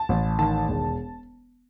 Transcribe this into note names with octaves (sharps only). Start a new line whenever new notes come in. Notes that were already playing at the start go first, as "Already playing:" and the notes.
Already playing: A5
A1
D#3 A5
E1